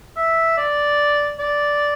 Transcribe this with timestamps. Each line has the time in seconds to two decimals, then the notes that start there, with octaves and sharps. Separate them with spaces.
0.16 E5
0.57 D5
1.39 D5